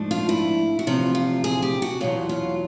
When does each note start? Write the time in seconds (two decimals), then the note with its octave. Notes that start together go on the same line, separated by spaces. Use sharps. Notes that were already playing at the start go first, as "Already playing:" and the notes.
Already playing: G#2 F3 A3 D4
0.11 F4
0.29 E4
0.79 F#4
0.87 E2 C3 F3 F4
1.15 F4
1.44 G#4
1.62 G4
1.82 F#4
2.01 E2 B2 F#3 F4
2.29 F4